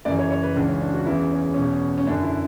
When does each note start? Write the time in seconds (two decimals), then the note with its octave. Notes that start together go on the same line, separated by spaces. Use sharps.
0.05 F#2 C#3 E3 D5
0.19 C#5
0.31 C#5
0.43 B4
0.56 C#2 C#3 E3 D4
0.68 C#4
0.81 D4
0.94 F#4
1.06 E2 C#3 E3 E4
1.31 C#4
1.54 E2 B2 C#4
1.98 C#4
2.07 F#2 D4
2.10 D3
2.23 E4